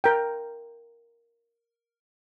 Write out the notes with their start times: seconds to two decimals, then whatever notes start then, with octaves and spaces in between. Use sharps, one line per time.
0.04 A#4 G5